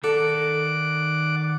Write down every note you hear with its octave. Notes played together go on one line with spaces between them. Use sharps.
D#3 A4 D5 F#5 D6